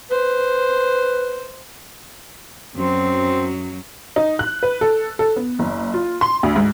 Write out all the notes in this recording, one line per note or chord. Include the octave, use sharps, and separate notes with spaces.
B4 C5
F#2 F#3 C4
D#4
F#6
B4
A4
A4
B3
F#1
F4
C6
D2
G#2